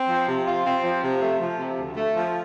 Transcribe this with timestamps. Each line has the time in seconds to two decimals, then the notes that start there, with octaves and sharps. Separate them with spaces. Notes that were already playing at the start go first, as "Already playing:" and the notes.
Already playing: C4
0.08 F3
0.28 C3
0.46 F4
0.65 C4
0.83 F3
1.03 C3
1.21 A3
1.40 F3
1.59 C3
1.78 D2
1.96 A3
2.15 F3